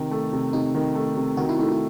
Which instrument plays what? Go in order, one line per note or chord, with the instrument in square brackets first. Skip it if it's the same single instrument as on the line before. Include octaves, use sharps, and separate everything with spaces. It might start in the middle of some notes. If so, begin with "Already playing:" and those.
Already playing: [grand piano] C3 D#3
A3
C3
[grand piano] C3 [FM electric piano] D#4
[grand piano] D#3
A3
C3
[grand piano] D#3 [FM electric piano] F#4
[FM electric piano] E4
[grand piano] A3 [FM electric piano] D#4
[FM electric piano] E4